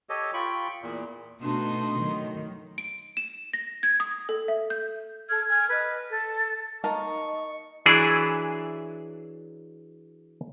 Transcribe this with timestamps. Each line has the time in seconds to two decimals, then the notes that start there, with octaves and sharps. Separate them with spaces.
0.09 G4 A4 C#5 D#5
0.34 F4 G5 B5 C#6
0.82 E2 A#2
1.42 B2 A3 D4 D#4 F#4 C6
2.01 D#3 F#3
2.78 D7
3.17 E7
3.53 A#6
3.83 G#6
4.00 D#6
4.29 A4
4.48 E5
4.70 G6
5.30 A4 F6 G#6
5.49 G#5 F6 G#6
5.71 B4 D#5
6.10 A4
6.84 A#3 D#4 A#4 D#5 A5 A#5 C#6
7.86 E3 F#3 D4 E4 G#4